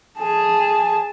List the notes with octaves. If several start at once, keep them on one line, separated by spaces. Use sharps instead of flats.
G#4 A5